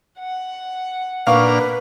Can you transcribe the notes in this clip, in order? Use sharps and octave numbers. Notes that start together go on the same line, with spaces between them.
F#5
A#2 D4 B4 F5 C#6 F6